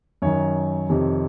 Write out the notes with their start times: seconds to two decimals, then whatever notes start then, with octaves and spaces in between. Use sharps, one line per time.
0.22 F#2 D#3 C#5
0.90 F2 C3 D#3